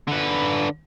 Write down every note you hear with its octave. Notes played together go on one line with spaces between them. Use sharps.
D3 B4